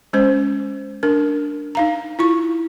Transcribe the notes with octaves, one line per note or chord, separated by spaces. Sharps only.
G#3 C#4 C5
D4 A#4
D#4 F5 A#5
E4 F4 C#6